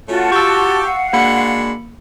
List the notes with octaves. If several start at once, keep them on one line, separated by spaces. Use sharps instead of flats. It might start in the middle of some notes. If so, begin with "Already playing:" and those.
A3 C#4 F4 F#4 A5
G4 C#6 E6
F5 F#5
G#3 A#3 D4 F#4 B5 C#7